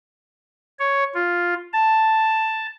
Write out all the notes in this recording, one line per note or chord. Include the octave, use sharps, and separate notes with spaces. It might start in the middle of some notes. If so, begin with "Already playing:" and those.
C#5
F4
A5